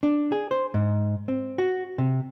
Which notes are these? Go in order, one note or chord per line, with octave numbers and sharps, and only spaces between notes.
D4
G#4
C5
G#2
C4
F#4
C3